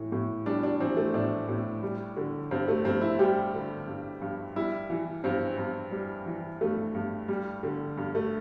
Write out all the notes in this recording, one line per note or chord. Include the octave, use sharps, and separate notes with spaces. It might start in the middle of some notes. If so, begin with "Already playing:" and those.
Already playing: A2 E3
A2
G3 D4
D4
E3 C4
A3
A2 D4
A2
G3
D3
G2 C4
A3
G2 C4
E4
G3 G4
D3
G2
G2
G3 E4
E3
G2 C4
G2
G3
E3
G2 A3
G2
G3
D3
G2
A3